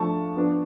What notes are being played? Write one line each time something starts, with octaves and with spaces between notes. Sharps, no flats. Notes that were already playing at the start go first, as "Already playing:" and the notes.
Already playing: F3 A3 D4 A5 C#6
F3 B3 D4